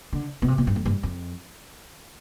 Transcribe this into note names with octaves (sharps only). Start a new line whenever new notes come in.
D3
B2
C3
B2
G2
F2
G2
F2